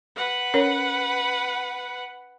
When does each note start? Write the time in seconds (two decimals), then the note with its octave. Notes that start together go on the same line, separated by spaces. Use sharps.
0.16 B4 F#5
0.54 C#4 A#4 C#5